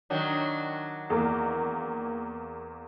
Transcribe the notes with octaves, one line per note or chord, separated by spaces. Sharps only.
D#3 F#3 D4
E2 A#3